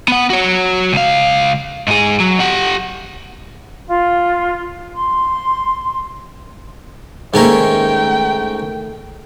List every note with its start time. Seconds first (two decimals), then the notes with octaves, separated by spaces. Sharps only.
0.08 B3 F#5
0.30 F#4 C#5
0.93 C#2 F5
1.88 G#2 G#4
2.20 F#3
2.40 G4 F#5
3.87 F4
4.95 C6
7.34 G#2 D#3 A3 A#3 C#4 A#4 G5